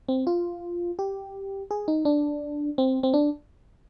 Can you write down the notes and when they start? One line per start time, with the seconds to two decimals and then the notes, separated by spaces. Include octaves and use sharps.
0.09 C4
0.27 F4
0.99 G4
1.71 G#4
1.88 D#4
2.05 D4
2.78 C4
3.03 C4
3.14 D4